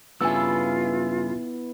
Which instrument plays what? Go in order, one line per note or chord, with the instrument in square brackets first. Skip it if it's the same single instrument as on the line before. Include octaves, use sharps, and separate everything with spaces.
[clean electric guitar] G2 C#3 A4 [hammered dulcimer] B3 E4 [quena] F4 [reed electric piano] G#5 E6